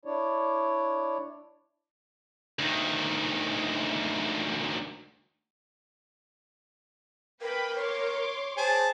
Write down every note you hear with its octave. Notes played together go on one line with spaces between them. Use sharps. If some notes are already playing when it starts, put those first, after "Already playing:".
D4 E4 C#5 D5
D2 D#3
A#4 B4 G5 B5
C#5 C6 D6
G#4 C5 A5